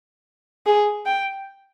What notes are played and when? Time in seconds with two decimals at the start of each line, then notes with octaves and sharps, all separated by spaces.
0.66 G#4
1.06 G5